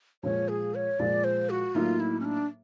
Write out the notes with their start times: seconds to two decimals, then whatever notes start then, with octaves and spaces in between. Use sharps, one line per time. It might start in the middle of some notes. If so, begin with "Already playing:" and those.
0.23 A#2 F3 G#3 C#5
0.49 G#4
0.75 C#5
0.99 A#2 F3 G#3 D5
1.24 C5
1.50 F#4
1.75 A2 F#3 A#3 D#4 F4
2.00 E4
2.20 C#4
2.25 D4